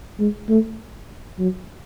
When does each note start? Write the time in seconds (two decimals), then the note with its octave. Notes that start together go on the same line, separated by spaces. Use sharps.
0.20 G#3
0.50 A3
1.39 F#3